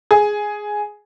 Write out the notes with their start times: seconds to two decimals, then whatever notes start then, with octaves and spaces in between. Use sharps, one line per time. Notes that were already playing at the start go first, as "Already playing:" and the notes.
0.11 G#4